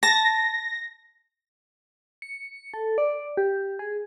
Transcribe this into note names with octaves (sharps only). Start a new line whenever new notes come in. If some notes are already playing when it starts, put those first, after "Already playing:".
A5 A#6
C#7
A4
D5
G4
G#4